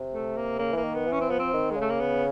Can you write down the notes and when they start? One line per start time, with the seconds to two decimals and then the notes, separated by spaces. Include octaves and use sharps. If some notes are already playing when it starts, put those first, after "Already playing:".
Already playing: C3
0.13 A3
0.36 A#3
0.59 C#3 A#3
0.73 E3 A#3
0.83 D#3
0.95 B3
1.07 E3
1.12 C#4
1.21 C4
1.30 F3 B3
1.39 C4
1.54 D#3
1.71 G#3
1.76 C#3 A3
1.90 A#3
2.00 B3